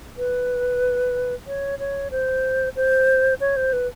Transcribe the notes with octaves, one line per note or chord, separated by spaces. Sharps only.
B4
C#5
C#5
C5
C5
C#5
C5
B4